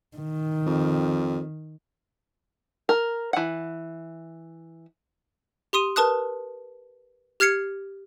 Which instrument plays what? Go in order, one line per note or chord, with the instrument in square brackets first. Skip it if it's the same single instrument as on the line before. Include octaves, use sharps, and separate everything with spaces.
[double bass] D#3
[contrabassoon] F2
[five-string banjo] A#4
E3 F#5
[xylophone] G4 C6 D#6 D#7
A#4 B4 A5 D#6 F#6
G4 F6 G#6 C7 C#7